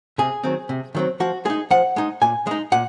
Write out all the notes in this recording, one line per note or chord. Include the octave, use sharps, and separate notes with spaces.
C3 G#4
D#3 F#3 C4
C3
D#3 F#3 C4
F3 F#4
G#3 D#4 G#4
F3 F#5
G#3 D#4
A#2 G#5
G#3 D#4
A#2 F#5